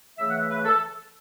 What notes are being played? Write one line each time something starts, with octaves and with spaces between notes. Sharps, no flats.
C#3 E3 A3 E5
F#5
E5
B4
A4